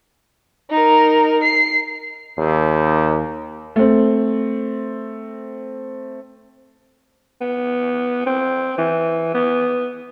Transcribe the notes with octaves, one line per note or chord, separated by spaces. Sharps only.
D#4 A#4
C7
D#2
A3 C4
B3
C4
E3
B3